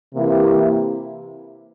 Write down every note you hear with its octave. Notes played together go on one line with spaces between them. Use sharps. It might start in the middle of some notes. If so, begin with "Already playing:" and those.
C3 E3 A#3 E4 G4